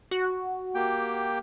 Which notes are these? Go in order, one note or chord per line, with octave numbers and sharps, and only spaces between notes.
F#4
A#3 G4 G5